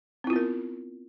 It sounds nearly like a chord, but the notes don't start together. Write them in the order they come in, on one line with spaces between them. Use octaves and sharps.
C4 E4 F4 B3 A#4